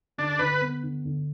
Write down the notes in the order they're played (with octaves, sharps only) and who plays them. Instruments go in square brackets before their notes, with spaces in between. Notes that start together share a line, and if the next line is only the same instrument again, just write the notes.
[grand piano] D3 [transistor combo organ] D4
[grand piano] D3 [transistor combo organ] B4
[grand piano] B3
D3
D3